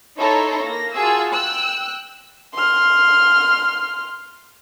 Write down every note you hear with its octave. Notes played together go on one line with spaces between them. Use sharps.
D#4 E4 A4 C#5 A#5 C6
A#3 A#6
F4 F#4 G#4 G#5 A5 E6
G5 E6 F#6
C6 F6